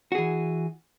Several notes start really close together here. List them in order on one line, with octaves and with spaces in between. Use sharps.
F#4 G#4 E3